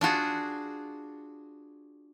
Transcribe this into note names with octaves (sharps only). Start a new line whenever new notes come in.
D4 F4 F#4 G#4